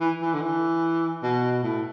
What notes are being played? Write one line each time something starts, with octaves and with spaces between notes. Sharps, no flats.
E3
E3
D3
E3
B2
A2